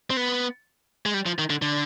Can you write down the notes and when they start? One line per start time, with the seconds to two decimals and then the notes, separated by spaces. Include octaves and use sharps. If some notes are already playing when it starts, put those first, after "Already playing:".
0.10 C4
0.17 B3
1.06 G#3
1.14 G3
1.26 F3
1.39 D#3
1.50 D3
1.62 D3